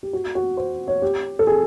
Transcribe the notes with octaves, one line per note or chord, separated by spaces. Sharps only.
G4
F#4
F#4
C5
C#5
G4
A4
G#4